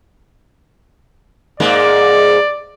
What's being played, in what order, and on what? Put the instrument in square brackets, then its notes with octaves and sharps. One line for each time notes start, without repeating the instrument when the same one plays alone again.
[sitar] G#2 G#3 A#3 [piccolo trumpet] D5